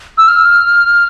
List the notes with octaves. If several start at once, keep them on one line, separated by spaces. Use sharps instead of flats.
E6
F6